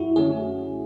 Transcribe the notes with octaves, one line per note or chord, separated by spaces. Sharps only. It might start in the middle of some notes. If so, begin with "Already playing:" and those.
Already playing: F#2 E4 F#4
D3 A3 C#4 G#4